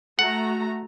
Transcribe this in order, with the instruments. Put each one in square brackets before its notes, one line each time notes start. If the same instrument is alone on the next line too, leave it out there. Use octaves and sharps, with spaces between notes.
[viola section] A3 F#4 A#5 [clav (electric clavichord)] F#5